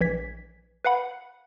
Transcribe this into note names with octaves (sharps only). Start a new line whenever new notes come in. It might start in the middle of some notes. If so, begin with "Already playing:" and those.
A#1 E3 G#6 B6
B4 F5 F#5 B5